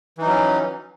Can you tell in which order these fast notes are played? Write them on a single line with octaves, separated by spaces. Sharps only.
E3 D#4 F#3 C#4